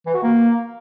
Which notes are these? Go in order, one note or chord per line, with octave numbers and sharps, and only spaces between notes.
E3
F#4
A#3